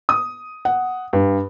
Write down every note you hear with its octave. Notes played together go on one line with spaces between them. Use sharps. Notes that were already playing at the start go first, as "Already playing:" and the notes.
D#6
F#5
G2